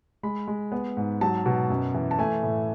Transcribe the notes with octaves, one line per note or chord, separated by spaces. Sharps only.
G#3 B5
G#3
B3
G#2
F#3 A5
B2
F#2
E3
A5
A3 G#5
A2